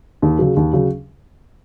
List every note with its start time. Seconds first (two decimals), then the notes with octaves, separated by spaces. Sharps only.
0.22 D#2
0.39 C#3 F#3
0.57 D#2
0.73 C#3 F#3